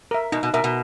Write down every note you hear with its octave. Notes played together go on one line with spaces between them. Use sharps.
A#4 E5
B2 D#4
B2
B2 A#4 E5
B2